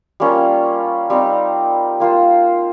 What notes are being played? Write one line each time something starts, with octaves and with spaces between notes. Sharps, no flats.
G3 A#3 C#4 F4
G3 C4 D#4
A#3 F4 C5